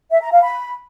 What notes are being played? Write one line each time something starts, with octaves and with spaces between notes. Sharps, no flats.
E5
A#5
F5
B5